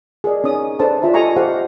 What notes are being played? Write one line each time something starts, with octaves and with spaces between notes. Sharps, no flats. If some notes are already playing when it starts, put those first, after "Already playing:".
G#4 A#4 D5 D#5
C#4 D#4 D#6
D4 A4 B4 C5 A5
D4 F4 E5 A#5
G4 A4 D#5 G#5 A#5 C#6
G4 A4 C5 F5 F#5